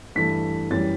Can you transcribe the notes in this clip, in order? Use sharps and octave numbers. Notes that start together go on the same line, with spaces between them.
G2 E3 A3 B6
F#2 E3 G3 A6